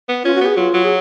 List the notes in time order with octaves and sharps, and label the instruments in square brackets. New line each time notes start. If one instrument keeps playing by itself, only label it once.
[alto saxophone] B3
[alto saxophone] C#4 [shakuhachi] F4
[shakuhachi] F#4
[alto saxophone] B3 [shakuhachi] G#4
[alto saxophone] F#3 [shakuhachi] F4
[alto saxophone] F#3
[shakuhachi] G#4